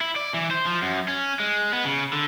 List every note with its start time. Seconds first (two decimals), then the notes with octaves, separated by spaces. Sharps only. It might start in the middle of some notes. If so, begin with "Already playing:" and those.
0.01 E4
0.16 D5
0.34 E3
0.51 C5
0.66 F3
0.82 F#2
1.08 C#4
1.40 G#3
1.73 B3
1.85 C#3
2.13 D3